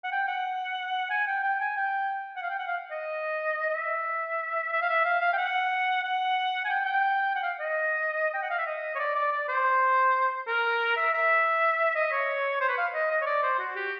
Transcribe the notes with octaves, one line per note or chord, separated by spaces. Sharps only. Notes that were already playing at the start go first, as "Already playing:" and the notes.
F#5
G5
F#5
G#5
G5
G5
G#5
G5
F#5
F5
G5
F#5
F5
D#5
D#5
E5
E5
F5
E5
F5
F5
G5
F#5
F#5
G#5
G5
G5
F#5
F5
D#5
G5
F#5
F5
E5
D#5
C#5
D5
D5
D5
C5
A#4
E5
E5
D#5
C#5
C5
B4
F5
D#5
D#5
C#5
D5
C5
F#4
G4